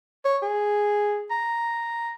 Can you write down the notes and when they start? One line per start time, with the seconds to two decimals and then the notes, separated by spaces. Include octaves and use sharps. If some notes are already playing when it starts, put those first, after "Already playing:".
0.25 C#5
0.42 G#4
1.31 A#5